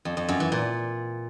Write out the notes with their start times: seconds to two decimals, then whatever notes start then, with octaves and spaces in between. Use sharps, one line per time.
0.05 F2
0.17 F2
0.29 F#2
0.40 E3
0.52 A#2